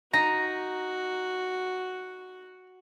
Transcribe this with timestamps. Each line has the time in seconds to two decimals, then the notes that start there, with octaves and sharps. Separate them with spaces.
0.14 D#4 F#4 A#5